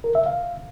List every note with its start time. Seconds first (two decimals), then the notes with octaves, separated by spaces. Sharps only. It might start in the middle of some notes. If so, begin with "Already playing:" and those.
0.04 A#4
0.15 E5
0.26 F5